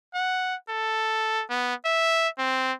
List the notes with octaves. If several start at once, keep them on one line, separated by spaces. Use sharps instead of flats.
F#5
A4
B3
E5
C4